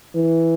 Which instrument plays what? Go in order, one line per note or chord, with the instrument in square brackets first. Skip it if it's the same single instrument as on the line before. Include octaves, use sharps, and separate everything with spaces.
[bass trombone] E3